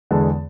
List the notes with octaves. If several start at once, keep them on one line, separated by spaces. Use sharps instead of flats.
E2 D3 G#3 B3 A5